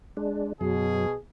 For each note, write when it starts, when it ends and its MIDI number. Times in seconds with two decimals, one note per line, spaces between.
0.17 0.53 56
0.17 0.53 62
0.61 1.06 42
0.61 1.15 47
0.61 1.06 54
0.61 1.15 68